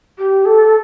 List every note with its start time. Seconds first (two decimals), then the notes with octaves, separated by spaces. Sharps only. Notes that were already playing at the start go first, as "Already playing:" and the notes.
0.18 G4
0.45 A4